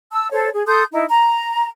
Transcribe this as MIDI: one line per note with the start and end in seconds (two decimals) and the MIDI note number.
0.12 0.30 81
0.12 0.30 88
0.32 0.48 69
0.32 0.48 72
0.32 0.48 73
0.53 0.64 68
0.67 0.83 69
0.67 0.83 84
0.67 0.83 87
0.67 0.83 91
0.92 1.04 63
0.92 1.04 64
1.09 1.68 82